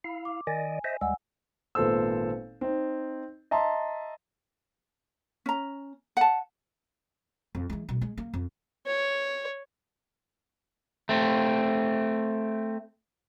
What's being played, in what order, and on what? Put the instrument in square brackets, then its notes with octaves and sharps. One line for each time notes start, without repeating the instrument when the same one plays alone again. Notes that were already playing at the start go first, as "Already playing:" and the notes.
[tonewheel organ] E4 F5
[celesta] D6
[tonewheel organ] D#3 D5 D#5 [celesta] G#5
[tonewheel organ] C5 D#5 E5
[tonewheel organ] D#2 G3 G#3 [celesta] F#5 G#5 E6
[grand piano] G#1 A#2 B3 A4 C5 E6
C4 D#4
D#5 E5 A5 A#5 C6
[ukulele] C#4 A#5
F#5 A5
[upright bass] F2
E3 G#3
G2 B2
G#3
A#3
F2
[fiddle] C#5
[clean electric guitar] A3 C4